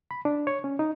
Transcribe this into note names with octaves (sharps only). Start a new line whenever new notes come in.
B5
D4
C#5
C#4
D#4